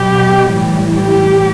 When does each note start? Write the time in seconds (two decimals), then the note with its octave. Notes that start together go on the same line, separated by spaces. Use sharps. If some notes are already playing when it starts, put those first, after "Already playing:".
Already playing: B2 F#3 G4
0.50 A2 E3 G3
0.90 G4